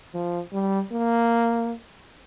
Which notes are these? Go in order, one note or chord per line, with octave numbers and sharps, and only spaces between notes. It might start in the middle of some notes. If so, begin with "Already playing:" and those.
F3
G3
A#3